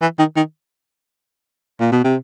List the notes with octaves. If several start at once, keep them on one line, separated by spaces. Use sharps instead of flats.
E3
D#3
D#3
A#2
B2
C3